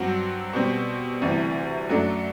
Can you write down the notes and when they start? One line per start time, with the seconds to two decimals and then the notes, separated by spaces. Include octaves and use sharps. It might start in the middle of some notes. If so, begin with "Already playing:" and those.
Already playing: G2 F#3 C4 F#4
0.53 B2 G3 C4
1.21 D2 C3 E3 G3
1.89 F#2 F#3 A3 D4